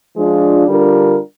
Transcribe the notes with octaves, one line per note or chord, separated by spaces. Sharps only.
F3 G#3 D4 F4
D3 G3 D4 F4 A#4